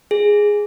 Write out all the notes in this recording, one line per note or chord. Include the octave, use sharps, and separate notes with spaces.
G#4